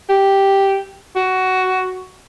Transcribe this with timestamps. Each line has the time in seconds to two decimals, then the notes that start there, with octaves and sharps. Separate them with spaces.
0.09 G4
1.16 F#4